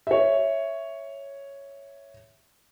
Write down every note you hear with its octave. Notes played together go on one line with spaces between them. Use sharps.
C#5 E5